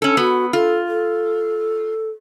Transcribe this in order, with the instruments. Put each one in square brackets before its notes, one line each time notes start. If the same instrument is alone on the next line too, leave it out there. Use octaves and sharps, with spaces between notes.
[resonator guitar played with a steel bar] C#4 A4
[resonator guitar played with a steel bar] B3 [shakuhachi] F#4
[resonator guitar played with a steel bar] F4 [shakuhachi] A4
[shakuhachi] A4